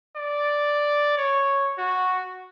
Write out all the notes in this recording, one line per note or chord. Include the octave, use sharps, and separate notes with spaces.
D5
C#5
F#4